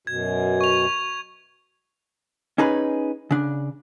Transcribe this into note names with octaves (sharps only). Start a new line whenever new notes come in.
F#2 B2 G#6
C#6 F7
C#4 D#4 G#4 B4
C#3 D4